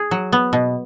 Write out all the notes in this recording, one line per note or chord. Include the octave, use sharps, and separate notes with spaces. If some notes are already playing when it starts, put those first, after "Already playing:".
Already playing: G#4
F#3
B3
B2